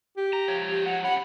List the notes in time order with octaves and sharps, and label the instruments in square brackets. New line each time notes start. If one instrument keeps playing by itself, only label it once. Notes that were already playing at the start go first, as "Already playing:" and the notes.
[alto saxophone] G4
[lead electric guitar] A#5
F3 C#5
[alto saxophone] G4
F#5
[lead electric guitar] C#4 B5 [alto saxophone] F#5